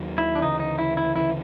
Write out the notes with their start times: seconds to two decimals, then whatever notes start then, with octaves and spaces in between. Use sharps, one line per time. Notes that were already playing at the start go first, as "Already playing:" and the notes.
Already playing: D#2 D#3 F#3
0.18 E4
0.35 D4
0.42 D2 C#3 E3 D#4
0.60 D#4
0.78 E4
0.97 E4
1.16 D2 C#3 E3 E4